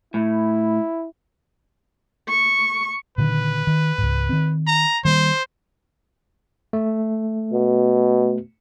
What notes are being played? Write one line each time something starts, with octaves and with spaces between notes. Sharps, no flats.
A2 E4
C#6
A#2 D3 D#3 B4
D#3
C#2 G#2
D#3 C4
A#5
D#3 G3 A#3 C5
A3
B2